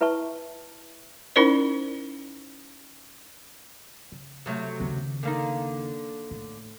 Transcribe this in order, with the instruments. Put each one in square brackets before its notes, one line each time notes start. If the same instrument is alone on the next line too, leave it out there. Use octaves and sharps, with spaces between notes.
[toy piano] E4 B4 E5 A5 C#6
[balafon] C#4 D#4 E4 A#4 C5 D5
[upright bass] C#3
[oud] C3 F#3 A3
[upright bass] D#2 C#3
[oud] D3 A#3 D#4
[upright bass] A2